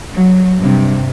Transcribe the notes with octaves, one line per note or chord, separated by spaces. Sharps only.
F#3
G2 C3